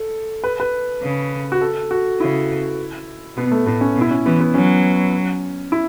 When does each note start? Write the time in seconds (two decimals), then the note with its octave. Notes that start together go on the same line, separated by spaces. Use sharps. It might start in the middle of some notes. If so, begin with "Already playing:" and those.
Already playing: A4
0.44 B4
0.60 B4
1.03 C#3
1.52 F#4
1.61 A4
1.91 F#4
2.20 C#3 E4
3.37 B2 B3
3.51 A3
3.66 A2 B3
3.81 C#4
3.96 B2
4.01 E4
4.11 C#4
4.26 E3 B3
4.40 B3
4.54 F#3 C#4
5.72 E4